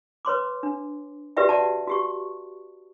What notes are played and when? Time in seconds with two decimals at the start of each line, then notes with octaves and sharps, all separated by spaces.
0.25 B4 C#5 C6 D6
0.63 D4
1.37 F#4 G4 B4 D5 E5 G5
1.49 D5 F#5 A5
1.88 F#4 G4 C#6